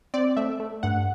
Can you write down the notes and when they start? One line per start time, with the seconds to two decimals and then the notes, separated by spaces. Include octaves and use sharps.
0.14 C4 D5
0.37 A3 E5
0.60 A3
0.83 G2 F#5